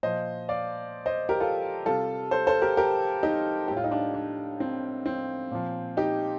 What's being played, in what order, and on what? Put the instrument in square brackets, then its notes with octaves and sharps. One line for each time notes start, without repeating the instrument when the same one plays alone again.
[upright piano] A#2 F3 C5 D#5
D5 F5
C5 D#5
G4 A#4
F4 A4
C3 G3 F4 A4
A4 C5
A4 C5
G4 A#4
G4 A#4
D#4 G4
A2 G3 G4
F4
D#4
D4 F4
D4
C4
C4
A#2 F3
D#4 G4